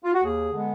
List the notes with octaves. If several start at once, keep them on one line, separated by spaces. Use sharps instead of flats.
F4
F#4
D#2 G#4
D3 G#3 B3